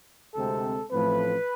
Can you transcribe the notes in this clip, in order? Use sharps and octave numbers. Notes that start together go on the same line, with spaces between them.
D2 C3 G#3 C4 A4
A1 A2 F3 A3 C4 B4